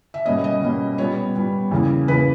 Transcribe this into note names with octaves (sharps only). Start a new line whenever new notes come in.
E5
B2 G3 A#3 C#4 D#5
D#5
B2 G3 A#3 C#4
A#2 G3 B3 C#5
A#2 G3 B3
E2 C#3 E3 A#3 C#4
E2 C#3 E3 A#3 C#4 B4